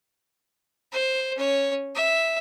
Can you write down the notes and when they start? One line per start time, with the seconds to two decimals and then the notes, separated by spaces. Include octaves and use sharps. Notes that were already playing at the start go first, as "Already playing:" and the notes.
0.92 C5
1.36 C#4 C#5
1.96 E5